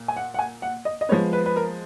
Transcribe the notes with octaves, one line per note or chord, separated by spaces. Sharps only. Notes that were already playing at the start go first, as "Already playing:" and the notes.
Already playing: A#2
G#5
F#5
F#5
G#5
F#5
D#5
D#5
F3 G#3 B3 C#5
B4
B4
A#4